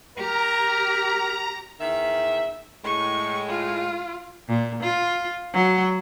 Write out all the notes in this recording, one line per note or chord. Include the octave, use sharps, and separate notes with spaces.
G4 A#4 A#5
E2 D#3 E5
A2 G#3 C#6
F4
A#2
F4
F#3